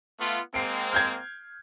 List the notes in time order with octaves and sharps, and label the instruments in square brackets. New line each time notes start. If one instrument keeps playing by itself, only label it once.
[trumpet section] A3 B3 F4
[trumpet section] G#3 A#3 C4 [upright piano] C7 D7
[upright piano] F6 G6 G#6